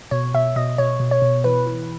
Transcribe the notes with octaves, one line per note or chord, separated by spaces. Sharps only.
B2 C#5
B2 E5
B2 D#5
B2 C#5
B2
C#5
B2
E3 B4
E3